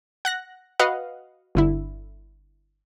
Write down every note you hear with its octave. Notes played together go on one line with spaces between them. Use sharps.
F#5 F#6 A#6
F#4 B4 D#5 F5 F#5
G1 D3 E4